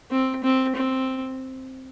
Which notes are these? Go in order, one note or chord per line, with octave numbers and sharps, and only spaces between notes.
C4
C4
C4